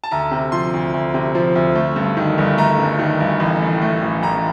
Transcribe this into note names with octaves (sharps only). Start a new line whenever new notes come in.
A5
D2 A#5
C3
F3 C6
D2
D2
C3
F3
D2
A3
G2
D#3
G1
A3 A#5
G2
D#3
G1
A1
A2
A3
A1
A1 A#5